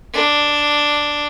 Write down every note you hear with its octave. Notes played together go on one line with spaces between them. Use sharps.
D4